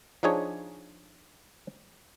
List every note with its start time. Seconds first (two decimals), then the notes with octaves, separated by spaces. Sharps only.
0.23 F3 D4 D#4 G#4 C#5